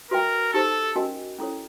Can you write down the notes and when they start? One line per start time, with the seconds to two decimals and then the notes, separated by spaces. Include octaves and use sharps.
0.11 F#4 A#4 B4 E5 G5
0.53 D#4 G4 A4 C5
0.96 C#4 F#4 A#4 D#5 G#5
1.39 C#4 E4 A4 C#5